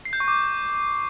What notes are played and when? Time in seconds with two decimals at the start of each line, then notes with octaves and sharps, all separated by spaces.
0.05 C7
0.13 G6
0.20 C#6
0.28 D6